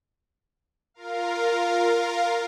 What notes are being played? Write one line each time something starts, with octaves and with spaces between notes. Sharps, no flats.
F4 A#4 F5